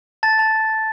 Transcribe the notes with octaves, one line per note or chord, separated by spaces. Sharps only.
A5 A6
A5